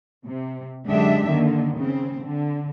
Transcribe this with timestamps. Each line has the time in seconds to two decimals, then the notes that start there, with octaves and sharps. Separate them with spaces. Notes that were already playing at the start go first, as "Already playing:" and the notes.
0.25 C3
0.88 F#2 D3 G#3 D4 G4 E5
1.27 D3 D#3 A#3
1.77 C#3 C4
2.24 D3